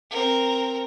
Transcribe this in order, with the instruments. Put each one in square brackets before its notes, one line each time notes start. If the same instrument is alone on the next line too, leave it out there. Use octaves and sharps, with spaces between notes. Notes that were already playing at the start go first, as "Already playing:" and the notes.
[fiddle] C4 A#4